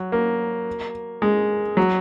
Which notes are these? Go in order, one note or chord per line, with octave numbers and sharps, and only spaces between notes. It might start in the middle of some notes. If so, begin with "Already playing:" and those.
Already playing: F#3
A#3
G#3
F#3